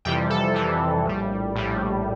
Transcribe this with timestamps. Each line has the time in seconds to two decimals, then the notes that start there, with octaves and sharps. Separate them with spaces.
0.05 F2 C3 E3 G3 G5
0.30 A4
0.54 F2 C3 E3 G3
1.05 A#1 A2 G3
1.55 A#1 A2 G3